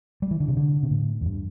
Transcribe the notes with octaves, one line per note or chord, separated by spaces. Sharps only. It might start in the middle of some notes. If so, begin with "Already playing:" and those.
G3
E3
D3
C3
D3
C3
A2
E2
G2